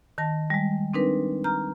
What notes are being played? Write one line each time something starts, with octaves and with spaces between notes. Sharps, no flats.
D#3 A5 A#6
G3 G#3
C4 D4 D#4 A#4 B4
A#5 F6 G6